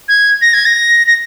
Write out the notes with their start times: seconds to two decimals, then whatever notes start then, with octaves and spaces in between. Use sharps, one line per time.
0.08 G#6
0.41 A#6
0.53 G#6
0.65 A#6
1.07 A#6